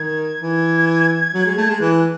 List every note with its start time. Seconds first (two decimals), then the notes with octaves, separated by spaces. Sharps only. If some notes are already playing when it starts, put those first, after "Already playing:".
Already playing: D#3 G#6
0.40 E3
1.34 F#3
1.46 G#3
1.57 A3
1.70 G#3
1.80 E3 F#6